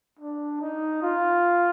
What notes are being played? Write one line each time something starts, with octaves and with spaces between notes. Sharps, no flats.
D4
D#4
F4